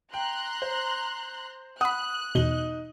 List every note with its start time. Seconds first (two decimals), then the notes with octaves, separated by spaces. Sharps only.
0.14 G5 A#5 C6 F#6
0.62 C5
1.81 F#5 B5 D#6 F#6
2.35 E2 B2 D#4 G7